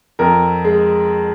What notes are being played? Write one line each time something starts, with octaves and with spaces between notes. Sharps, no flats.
F2 A#4
G#3